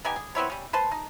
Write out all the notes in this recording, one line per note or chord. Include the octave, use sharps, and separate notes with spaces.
B3 D#4 G4 G#5
G#4
B3 C4 E4 C#5
G3 C#4
B4 C5 A5 C6
D#4